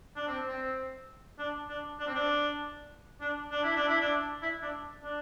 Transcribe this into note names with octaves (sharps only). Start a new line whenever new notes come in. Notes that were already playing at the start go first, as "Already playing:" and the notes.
D4
C4
C4
D4
D4
D4
C4
D4
D4
D4
E4
D4
E4
D4
E4
D4
D4